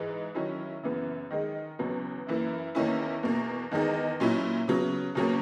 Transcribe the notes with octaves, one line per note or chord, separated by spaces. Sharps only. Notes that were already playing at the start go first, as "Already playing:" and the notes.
Already playing: G#2 E3 G#3
D#3 F#3 C#4 E4
F#2 C#3 E3 B3
D#3 G#3 D#4
E2 C#3 F#3 B3
F#2 E3 A#3 E4
E2 D#3 A#3 C#4 E4
E2 B2 A#3
E2 D#3 G#3 D#4
A#2 F#3 C#4 E4
C#3 F#3 B3
E2 C#3 F#3 A#3 C#4